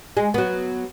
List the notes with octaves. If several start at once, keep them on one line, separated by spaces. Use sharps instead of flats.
G#3
F#3 B3